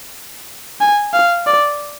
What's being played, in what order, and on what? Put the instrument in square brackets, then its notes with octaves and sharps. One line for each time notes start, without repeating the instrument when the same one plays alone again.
[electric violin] G#5
F5
D5